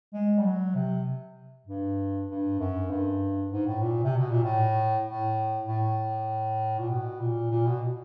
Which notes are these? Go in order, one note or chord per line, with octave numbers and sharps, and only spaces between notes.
G#3
G3
F#3
C3
G2
G2
F#2
G2
G#2
A2
A#2
C3
B2
A#2
A2
A2
A2
A#2
B2
A#2
A#2
B2